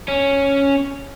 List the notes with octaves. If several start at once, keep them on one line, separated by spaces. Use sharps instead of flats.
C#4